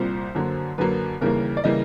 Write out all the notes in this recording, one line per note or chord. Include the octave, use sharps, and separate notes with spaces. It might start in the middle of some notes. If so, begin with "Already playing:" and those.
Already playing: C2 A#2 G3 C5
F#2 D3 F#3 A#3
F#2 D3 F#3 A#3 B4
D#2 C#3 E3 G3 A#3 A#4
D5
C#3 E3 G3 A#3 D#5